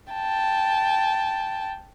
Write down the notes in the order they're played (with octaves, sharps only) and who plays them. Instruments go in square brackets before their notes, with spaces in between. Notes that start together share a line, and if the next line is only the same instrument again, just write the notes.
[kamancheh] G5 A5